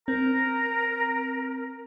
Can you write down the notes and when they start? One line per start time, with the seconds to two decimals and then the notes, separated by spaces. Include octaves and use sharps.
0.08 C4 A#4 A#5